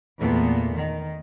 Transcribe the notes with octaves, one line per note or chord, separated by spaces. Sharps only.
E2 A#2 A3 B3
D#3